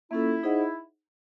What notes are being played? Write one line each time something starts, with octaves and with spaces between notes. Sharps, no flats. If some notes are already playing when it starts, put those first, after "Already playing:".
A#3 C#4 E4 F4 A4
D#4 G#4 C5 D#5 F#5